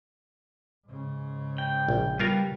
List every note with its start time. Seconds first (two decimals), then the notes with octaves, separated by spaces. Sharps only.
0.86 G#2 C#3
1.58 G5
1.89 A#1
2.19 G3 B3 F4 A#4